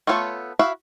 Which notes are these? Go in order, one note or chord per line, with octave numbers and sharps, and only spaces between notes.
A3 B3 F4 A4 C#5
E4 F#4 E5 F5